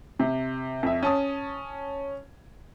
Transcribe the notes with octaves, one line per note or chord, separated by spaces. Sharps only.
C3
F2 E5
C#4 A5 D#6